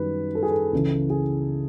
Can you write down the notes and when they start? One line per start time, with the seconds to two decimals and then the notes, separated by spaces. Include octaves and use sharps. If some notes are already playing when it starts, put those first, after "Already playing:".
Already playing: F#2 D#3 G3 B4
0.35 A4
0.43 G#4
0.51 A4
0.73 C#2 C#3 E3
1.10 G#4